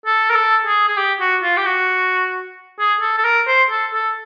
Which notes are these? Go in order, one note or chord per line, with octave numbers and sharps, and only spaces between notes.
A4
A#4
A4
G#4
G#4
G4
F#4
F4
G4
F#4
G#4
A4
A4
A#4
C5
A4
A4